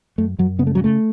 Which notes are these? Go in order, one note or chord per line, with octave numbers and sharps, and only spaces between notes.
F#2 A3
F#2 F#3
C#3 B3
A3
F#3
C#3 A3